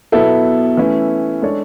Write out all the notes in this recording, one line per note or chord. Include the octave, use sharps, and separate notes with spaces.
B2 F#3 B3 E4 A4
E3 A3 C#4 E4
G#3 D4 A4 C#5